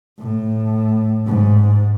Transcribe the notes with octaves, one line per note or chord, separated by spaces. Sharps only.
A2
G#2